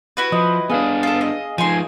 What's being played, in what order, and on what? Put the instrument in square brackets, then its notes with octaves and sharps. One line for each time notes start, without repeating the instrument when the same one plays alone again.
[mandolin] E4 F#4 B4
[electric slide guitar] F3 [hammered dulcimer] D#5
[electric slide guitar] B3 D4 [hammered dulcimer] G#4 F5
[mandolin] F4 A4
D#5
[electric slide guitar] F3 D#4 [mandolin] G#5 C6